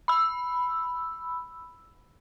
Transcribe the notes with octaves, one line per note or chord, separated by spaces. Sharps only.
B5 E6